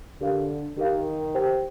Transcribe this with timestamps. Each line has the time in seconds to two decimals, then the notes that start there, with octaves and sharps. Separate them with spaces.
0.21 D3 G4 A#4 F5
0.77 D#3 G4 A#4 F5
1.34 G4 C5 G5